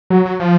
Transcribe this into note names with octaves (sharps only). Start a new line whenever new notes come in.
F#3
F#3
F3